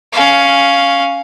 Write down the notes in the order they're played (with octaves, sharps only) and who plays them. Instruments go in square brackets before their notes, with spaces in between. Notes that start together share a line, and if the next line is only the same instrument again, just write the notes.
[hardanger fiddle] C#4 F5